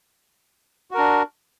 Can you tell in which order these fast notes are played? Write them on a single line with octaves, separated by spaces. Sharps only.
F#4 A#4 D4